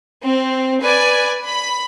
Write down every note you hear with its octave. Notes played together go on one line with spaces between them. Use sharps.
C4
B4 D5 G#5
B5